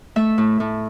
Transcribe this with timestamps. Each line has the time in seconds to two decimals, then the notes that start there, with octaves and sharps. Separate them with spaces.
0.16 A3 E5
0.38 A2
0.60 A2